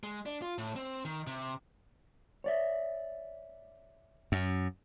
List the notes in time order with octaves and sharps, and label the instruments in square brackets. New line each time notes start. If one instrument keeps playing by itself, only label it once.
[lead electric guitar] G#3
D4
F4
A2
C4
D#3
C3
[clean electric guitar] C#5 D5 E5
[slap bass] F#2